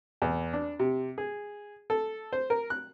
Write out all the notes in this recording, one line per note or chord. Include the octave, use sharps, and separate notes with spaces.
E2
D4
C3
G#4
A4
C5
A#4
F#6